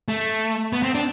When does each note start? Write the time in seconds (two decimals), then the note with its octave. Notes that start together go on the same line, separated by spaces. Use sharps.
0.08 A3
0.73 B3
0.83 C4
0.95 D4